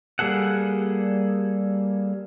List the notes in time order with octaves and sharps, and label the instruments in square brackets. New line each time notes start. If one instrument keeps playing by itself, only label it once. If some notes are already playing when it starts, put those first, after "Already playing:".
[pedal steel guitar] G3 A#3 G#4 A4 F#5